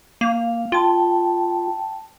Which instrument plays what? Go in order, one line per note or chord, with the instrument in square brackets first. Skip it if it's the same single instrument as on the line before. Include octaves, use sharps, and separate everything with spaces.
[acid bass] A#3 [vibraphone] F5
[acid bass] F4 [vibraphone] G5 A5